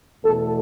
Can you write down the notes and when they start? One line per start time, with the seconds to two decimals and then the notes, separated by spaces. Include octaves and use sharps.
0.24 E2 B2 A3 A4